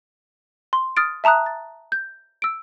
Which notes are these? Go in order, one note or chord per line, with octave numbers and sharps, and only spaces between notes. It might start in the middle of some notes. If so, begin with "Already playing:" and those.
C6
D#6 F6 A6 D7
E5 A5 A#5 D#6 F#6
A6
G6
E6 D7